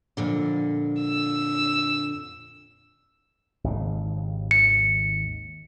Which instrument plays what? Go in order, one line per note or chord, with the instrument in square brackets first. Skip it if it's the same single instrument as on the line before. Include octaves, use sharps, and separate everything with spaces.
[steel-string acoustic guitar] F2 A#2 D3
[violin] E6
[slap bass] G#1 D#2 C#3
[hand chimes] C#7